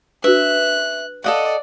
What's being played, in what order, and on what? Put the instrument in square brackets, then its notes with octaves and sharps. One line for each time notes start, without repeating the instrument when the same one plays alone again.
[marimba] D4 F#4 [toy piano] B4 [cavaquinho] E5 [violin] F#6
[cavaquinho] A4 D#5 F#5 [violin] D5 [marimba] F5